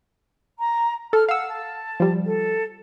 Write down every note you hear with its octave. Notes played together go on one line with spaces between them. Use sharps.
A#5
A4 F6
F5 F#5 E6
A5
F3 G3
A4